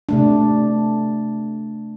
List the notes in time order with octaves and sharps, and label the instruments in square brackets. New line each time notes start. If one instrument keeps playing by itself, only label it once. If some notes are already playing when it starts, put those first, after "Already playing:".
[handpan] C3 A3 D4